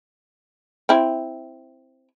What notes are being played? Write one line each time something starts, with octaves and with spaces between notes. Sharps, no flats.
C4 E4